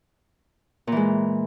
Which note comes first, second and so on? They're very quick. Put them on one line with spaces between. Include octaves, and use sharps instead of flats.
A#2 E3 G#3